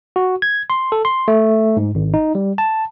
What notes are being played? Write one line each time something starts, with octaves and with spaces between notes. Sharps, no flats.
F#4
G#6
C6
A4
C6
A3
G#2
G#1
D#4
G3
A5